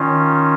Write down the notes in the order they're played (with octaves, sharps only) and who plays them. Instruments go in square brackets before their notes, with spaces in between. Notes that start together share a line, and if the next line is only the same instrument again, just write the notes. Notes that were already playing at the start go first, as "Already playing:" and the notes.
Already playing: [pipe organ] D#3 C#4 F4